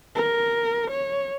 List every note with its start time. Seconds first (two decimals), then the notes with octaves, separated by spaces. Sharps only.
0.15 A#4
0.91 C#5